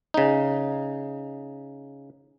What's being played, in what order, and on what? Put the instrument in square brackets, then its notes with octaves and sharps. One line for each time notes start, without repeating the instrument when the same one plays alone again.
[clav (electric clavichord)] C#3 D#4